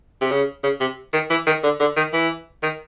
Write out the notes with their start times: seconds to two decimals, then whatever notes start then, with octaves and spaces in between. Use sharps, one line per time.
0.21 C3
0.31 C#3
0.64 C#3
0.80 C3
1.13 D#3
1.30 E3
1.47 D#3
1.64 D3
1.80 D3
1.96 D#3
2.13 E3
2.63 D#3